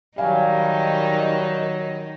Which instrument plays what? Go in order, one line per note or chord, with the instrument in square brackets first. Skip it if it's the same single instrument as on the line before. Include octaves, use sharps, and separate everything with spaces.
[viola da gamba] D#3 D#4 [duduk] F#3 [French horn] G3 [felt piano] F5 G#5